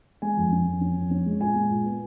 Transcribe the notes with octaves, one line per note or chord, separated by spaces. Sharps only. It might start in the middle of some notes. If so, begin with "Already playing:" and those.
G#3 G#5
F2
C#4
F2
C#4
F2
C#4
G#3
A#2 G#5
G#3
A#2
B3